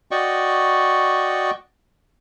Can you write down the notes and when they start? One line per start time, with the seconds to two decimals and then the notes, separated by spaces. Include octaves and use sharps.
0.11 F#4 D5 D#5 G5 C#6